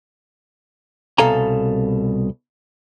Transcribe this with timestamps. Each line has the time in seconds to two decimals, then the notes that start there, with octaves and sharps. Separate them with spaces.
1.18 C2 B2 A4 F5 G#5 A#5